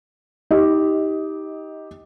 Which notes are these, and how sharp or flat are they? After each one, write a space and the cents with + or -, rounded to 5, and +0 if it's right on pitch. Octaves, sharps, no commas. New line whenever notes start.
D#4 +30 G4 +0 D#5 +15